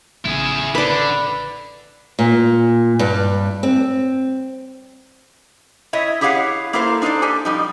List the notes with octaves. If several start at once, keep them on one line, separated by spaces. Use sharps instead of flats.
A1 C#3 E4 G#4
D3 B4 D5
A#2
G2
C4
E4 C#5 D#5 E5
E4 G4 G#4 C#5 F5 F#5
A#3 E4 A4 A#4 C5 F5
D4 D#4 A4 C5 D5
G4 A4 G#5
F3 G3 D#4